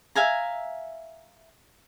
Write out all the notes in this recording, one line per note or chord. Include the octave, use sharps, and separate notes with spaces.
E5 F5 G#5 A#5